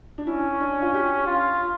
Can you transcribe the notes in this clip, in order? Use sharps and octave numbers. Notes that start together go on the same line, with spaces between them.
D4
C#4 E4
D4
F4
G4
F4